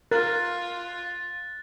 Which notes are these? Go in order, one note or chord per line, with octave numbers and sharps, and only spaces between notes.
F4 A#4 F#6 A6